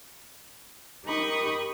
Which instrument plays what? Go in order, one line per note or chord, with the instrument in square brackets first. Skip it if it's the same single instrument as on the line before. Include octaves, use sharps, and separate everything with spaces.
[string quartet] D#4 G4 A#4 B5 C#6 D#6